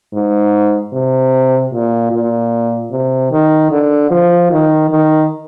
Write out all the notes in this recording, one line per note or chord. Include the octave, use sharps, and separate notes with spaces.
G#2
C3
A#2
A#2
C3
D#3
D3
F3
D#3
D#3